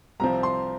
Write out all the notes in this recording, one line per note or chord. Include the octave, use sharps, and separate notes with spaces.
C2 C3 F3 C4 A#5
C6